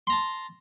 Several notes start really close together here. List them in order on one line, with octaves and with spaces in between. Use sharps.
C6 A#5 A5